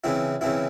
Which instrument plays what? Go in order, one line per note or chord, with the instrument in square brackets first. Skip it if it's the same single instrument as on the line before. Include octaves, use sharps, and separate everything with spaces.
[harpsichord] C#3 E3 C4 E4
C#3 E3 C4 E4